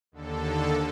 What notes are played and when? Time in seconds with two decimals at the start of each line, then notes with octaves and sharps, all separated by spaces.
0.12 D#2 D3 A4